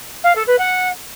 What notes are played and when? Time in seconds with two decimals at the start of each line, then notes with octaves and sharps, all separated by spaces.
0.23 F5
0.35 A4
0.47 B4
0.58 F#5